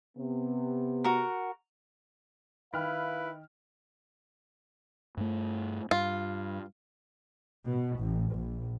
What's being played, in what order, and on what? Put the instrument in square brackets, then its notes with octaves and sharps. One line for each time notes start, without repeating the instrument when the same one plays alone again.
[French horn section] C3 B3
[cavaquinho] F#4 A#4
[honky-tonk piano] D#3 G5 F6 [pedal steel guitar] E4 [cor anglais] B4 [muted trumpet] F5
[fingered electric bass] G2 A3
[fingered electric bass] G2 [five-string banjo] F4
[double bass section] B2
A1
A#1